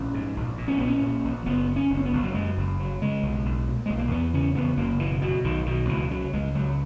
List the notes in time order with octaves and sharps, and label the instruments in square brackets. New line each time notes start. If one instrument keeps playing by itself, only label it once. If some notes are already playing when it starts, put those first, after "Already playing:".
Already playing: [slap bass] A#1 C#4
G#2
A#1
A#2
C#4
A#1 B3
C#4
A#2
A#1
F#1 B3
C#3
C#4
F#1
C#4
B3
F#1
F#3
F#2 G#3
F#1
C#3 F#3
C#3 G#3
B1
B1
A#2
B1 G#3
A#3
E2 B3
C#3 C#4
E2 B3
F#1 A#3
B2 E3
B2 F#3
B1 D#3
B2 D#3
C#2 E3
C#3 F#3
C#2 G#3
C#2 F#3